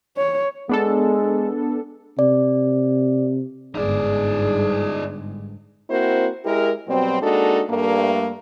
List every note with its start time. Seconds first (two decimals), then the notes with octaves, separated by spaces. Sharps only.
0.17 C#5
0.69 G#3 B3 D4 A4
2.19 C3 D5
3.75 G1 G#2 D#4 G#4 D5
5.90 A#3 C4 E4 F#4 A#4 C5
6.44 G#3 E4 G4 A#4
6.88 B2 F#3 G3 C4
7.21 G#3 A#3 D4 D#4 F#4 A4
7.69 G2 A3 A#3